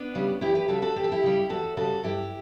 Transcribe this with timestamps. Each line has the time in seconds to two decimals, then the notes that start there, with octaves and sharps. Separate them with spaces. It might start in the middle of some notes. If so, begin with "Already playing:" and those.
Already playing: B3 D4
0.15 C#3 G3
0.41 E2 E4 G4
0.55 G4 B4
0.68 C#3 G3 F#4 A4
0.82 F#4 A4
0.96 E2 G4
1.04 A4
1.12 E4 G4
1.23 C#3 G3
1.49 E2 F#4 A4
1.77 C#3 G3 F#4 A4
2.03 G2 E4 G4